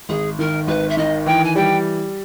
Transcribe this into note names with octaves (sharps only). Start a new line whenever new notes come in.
G#1 G#4
D#3 A#4
G#1 B4
E5
D#3 D#5
E3 G5
G#5
G3 G5